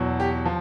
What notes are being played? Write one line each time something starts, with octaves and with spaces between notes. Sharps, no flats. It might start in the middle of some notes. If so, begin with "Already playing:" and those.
Already playing: E2 B2 F#3
G4
F3